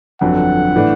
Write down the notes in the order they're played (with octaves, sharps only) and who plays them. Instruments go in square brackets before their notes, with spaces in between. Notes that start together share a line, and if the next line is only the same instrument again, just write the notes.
[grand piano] G1 F2 D3 F#3 [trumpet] F#5
[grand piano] A2 E3 A3 D4